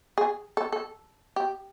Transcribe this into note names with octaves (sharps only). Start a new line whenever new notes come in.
G#4
A4
A4
G4